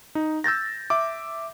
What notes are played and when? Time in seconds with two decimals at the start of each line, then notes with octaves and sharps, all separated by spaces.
0.15 D#4
0.44 E6 G6 A6 A#6
0.90 E5 D6